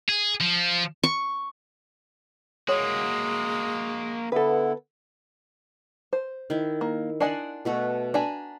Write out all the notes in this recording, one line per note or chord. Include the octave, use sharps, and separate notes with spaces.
G#4
F3
C#6
G#3 A#3 F#4 C#5
D3 B3 E4 A4 B4
C5
D#3 E4
A#3
D4 D5 D#5 F#5 G#5 C6
B2 A3 F#4
D4 G#5 A#5 B5